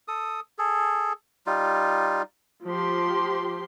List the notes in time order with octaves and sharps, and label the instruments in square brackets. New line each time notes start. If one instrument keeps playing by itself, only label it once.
[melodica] A4 D#6
G#4 A4
G3 D#4 F4
[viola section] F3 G4 C6